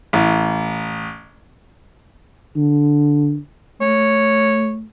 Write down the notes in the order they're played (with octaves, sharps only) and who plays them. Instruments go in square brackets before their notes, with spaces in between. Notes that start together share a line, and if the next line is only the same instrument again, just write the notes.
[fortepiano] A1
[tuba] D3
[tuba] A3 [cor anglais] C#5